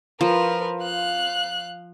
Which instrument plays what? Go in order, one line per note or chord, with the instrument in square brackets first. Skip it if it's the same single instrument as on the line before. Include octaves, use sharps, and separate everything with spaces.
[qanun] F3 [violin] A#4 B4
[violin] F5 F#6